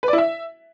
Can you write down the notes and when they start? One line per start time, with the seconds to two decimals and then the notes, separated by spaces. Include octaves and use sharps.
0.03 B4
0.08 D5
0.13 E4
0.18 E5